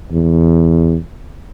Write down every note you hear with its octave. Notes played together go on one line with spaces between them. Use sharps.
E2